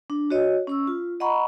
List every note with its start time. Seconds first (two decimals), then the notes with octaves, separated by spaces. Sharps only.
0.10 D4
0.30 F#4 C#5 D#5
0.67 C#4 C#6 E6
0.87 F4
1.20 D#5 F#5 A#5 B5 C#6